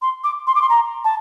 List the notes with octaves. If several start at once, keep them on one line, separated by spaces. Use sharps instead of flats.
C6
D6
C6
D6
C6
A#5
A5